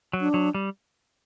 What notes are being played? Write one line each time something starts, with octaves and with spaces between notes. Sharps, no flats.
F#3
D4
F#3
G3